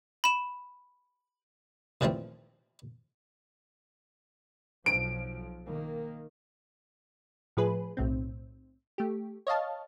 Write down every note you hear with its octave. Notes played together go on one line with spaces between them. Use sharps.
B5 E7
D#2 A#2 E3 F3 A3 C4
B1 F3 D7
D#3 A#3
A2 F3 G#4 B4
B1 A2 C4
A3 G4
C#5 D#5 F5 A5